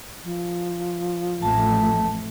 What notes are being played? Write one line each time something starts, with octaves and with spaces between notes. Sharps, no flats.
F3
A1 F2 A3 A5